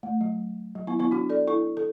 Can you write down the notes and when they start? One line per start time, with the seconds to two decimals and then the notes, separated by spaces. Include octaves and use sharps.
0.03 A3
0.21 F#3
0.75 F#3
0.87 B3 E4
1.00 B3 E4
1.11 D4 F#4
1.30 A4 D5
1.47 E4 A4
1.77 A4